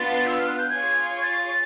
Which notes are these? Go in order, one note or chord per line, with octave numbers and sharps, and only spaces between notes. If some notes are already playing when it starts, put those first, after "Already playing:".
Already playing: B3 D4 F4 A6
E6
F6
F#6
G6
F4 G#4 C#5 G#6
A6